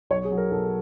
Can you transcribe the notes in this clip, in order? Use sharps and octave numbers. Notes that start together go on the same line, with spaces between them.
B1 C#5
G#4
F#3
A#4
B1 A4